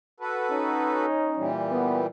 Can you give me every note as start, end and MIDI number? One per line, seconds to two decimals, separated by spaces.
0.20 1.06 66
0.20 1.06 69
0.20 1.06 71
0.51 1.49 61
0.51 1.49 63
1.36 2.07 46
1.36 2.07 52
1.36 2.07 55
1.72 2.01 59